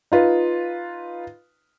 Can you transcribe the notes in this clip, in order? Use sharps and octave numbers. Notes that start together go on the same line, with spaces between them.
D#4 F4 B4